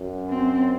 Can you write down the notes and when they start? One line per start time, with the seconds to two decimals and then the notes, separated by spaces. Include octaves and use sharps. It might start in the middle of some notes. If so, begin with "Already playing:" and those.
Already playing: F#2
0.29 C4